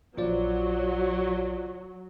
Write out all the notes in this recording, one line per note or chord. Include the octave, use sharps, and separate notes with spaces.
A#1 F#3 F4 C5 D5